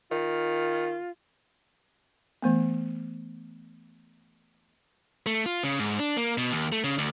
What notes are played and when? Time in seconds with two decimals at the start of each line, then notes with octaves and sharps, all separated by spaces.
0.11 D#3 F4
2.42 E3 A3 B3
5.26 A3
5.46 F4
5.63 C#3
5.79 G#2
5.99 D4
6.17 A#3
6.38 B2
6.51 D#2
6.72 A3
6.84 C#3
6.98 D2